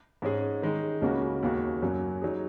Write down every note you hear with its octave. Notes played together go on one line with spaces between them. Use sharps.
G#2 G#3 C#4 G#4
D#3 G#3 D#4
C#2 C#3 A#3 C#4 F#4
D#2 C#3 A#3 F#4
F#2 F#3 A#3
F#3 D#4 G#4